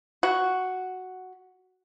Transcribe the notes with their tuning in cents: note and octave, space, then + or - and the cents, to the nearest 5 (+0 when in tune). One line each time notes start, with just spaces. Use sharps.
F#4 +0 B5 +20